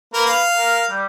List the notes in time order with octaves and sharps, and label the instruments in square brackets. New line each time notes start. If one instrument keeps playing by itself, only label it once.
[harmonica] A#3 A#4 [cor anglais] B4
[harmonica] F5
[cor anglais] A#4
G3